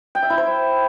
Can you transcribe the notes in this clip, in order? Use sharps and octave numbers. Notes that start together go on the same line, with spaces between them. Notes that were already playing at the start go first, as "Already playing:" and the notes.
G5
E5
E4
C5